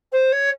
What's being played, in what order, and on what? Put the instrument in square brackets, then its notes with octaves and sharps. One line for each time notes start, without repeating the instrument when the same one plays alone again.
[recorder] C5
C#5